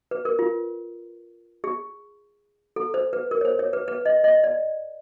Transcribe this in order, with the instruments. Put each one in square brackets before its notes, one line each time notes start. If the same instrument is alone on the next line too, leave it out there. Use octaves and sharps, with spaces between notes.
[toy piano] B4
A#4
F4
G#4
A4
C5
B4
A#4
C#5
C5
C#5
B4
B4
D#5
D#5
D5